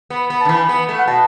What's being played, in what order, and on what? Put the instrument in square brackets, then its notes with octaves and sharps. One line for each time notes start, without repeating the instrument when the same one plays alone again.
[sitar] B3
B3
[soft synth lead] A5
[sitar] D3
[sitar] E3 [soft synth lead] B5
[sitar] B3
A3
[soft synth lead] F#5
[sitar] B2 [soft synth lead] A5